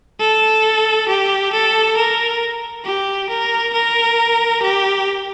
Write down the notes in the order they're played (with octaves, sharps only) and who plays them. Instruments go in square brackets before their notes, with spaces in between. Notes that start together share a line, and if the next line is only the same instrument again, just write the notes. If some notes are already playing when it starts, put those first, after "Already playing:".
[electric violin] A4
G4
A4
A#4
G4
A#4
A#4
G4